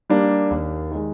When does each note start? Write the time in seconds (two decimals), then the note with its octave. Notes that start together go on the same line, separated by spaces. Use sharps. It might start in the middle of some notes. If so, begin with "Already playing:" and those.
0.10 G3 A#3 D4
0.50 D#2
0.91 D#3 G#3